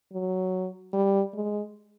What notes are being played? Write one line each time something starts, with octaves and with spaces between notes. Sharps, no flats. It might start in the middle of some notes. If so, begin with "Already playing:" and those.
F#3
G3
G#3